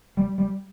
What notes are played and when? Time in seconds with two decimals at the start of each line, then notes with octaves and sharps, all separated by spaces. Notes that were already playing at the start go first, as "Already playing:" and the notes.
0.17 G3
0.38 G3